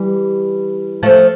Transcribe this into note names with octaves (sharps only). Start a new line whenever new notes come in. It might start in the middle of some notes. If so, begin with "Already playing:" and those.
Already playing: E3 G3
F3 A3